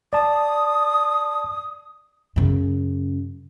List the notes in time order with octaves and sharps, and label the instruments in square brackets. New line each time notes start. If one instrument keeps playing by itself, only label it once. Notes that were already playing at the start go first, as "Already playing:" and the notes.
[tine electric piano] D5 A5 [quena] D#6
[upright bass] F#2 C#3